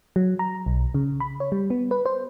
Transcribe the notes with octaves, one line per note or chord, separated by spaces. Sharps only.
F#3
A#5
B1
C#3
B5
C#5
G3
B3
B4
C5